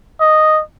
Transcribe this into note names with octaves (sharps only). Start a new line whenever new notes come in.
D#5